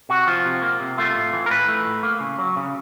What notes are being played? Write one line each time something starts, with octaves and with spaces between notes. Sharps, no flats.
C3 F#4
F3 F4
C3
A#3
C3
A3 F4
A2
E3
A#4
A2 B4
A3
A2
A#3
C#3
F#3
C#3